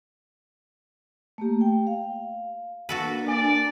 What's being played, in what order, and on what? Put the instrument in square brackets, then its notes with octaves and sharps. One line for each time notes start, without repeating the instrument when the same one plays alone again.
[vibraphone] A3 A#3 G4
G5
F5
[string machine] A#3 D4 [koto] F#4 A4 B4
[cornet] D5 [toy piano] G#5